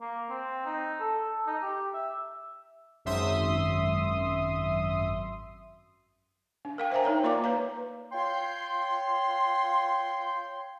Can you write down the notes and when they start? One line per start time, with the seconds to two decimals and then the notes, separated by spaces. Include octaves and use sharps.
0.01 A#3
0.30 C4
0.66 D#4
1.00 A4
1.47 D#4
1.62 G4
1.94 E5
3.05 G#1 F#2 E5 C6 D#6
6.65 D4
6.78 A#4 F5 G5
6.92 C5 E5 F5 G5 G#5 A#5
7.04 D#4 A#4 C#5 A#5
7.23 A#3 F4 D5 F5 A#5 D6
7.44 B4 C#5 F5 A#5
8.12 F4 C#5 G5 C6